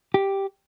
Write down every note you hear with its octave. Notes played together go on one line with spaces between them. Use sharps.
G4